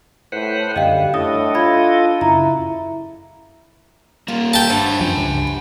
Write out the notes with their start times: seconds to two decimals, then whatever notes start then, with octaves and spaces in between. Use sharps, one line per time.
0.32 A2 B4 C5 F#5
0.76 F#2 D3 G3 D#5 F5 G5
1.14 A2 D4 A4 D#5 D#6
1.55 F4 B5 G#6
2.21 F#2 C#3 E4 A#5
4.28 G3 A#3 F4
4.54 E5 G5 A5
4.70 G2 C5 F#5
5.01 F#2 F3 F#5 G#5
5.17 C#2